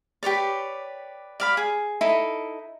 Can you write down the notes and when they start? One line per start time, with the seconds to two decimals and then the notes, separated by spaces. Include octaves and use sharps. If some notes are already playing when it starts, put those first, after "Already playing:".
0.23 G4 B4 C#5 D5
1.40 D5 F5 B5
1.57 G#4
2.01 D#4 E4 A4